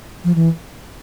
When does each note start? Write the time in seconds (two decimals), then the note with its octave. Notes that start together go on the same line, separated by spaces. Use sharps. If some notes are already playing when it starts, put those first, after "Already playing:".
0.24 F3
0.35 E3